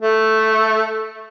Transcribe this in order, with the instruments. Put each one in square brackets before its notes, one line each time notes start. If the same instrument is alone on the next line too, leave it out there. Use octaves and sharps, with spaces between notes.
[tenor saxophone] A3